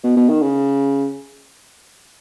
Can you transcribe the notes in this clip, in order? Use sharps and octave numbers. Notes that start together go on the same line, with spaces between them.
B2
B2
D#3
C#3